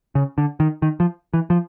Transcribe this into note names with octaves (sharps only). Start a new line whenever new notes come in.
C#3
D3
D#3
D#3
F3
E3
F3